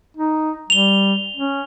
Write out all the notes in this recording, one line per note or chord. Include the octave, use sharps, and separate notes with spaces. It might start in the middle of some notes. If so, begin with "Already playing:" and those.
D#4
G3 F7 G7
C#4